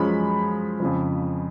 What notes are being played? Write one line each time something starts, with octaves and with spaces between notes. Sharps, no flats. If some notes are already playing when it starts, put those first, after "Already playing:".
Already playing: F#2 F3 G#3 C#4 B5
F2 C#3 F3